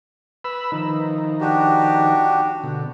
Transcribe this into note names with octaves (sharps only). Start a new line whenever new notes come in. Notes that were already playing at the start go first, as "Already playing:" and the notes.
B4 B5 E6
D#3 F3 D#4
D4 F#4 G4
B2 D3